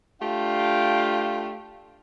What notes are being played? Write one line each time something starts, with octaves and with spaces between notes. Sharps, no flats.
A3 D4 F4 G4 F5 G5